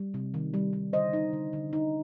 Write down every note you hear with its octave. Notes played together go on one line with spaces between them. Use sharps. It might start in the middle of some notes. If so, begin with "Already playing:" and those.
Already playing: G3
C3
D#3
G3
G3
D3 C5 D#5
D#4
D3
D3
D#4